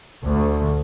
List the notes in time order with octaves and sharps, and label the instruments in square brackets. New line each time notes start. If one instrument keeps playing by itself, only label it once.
[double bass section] D2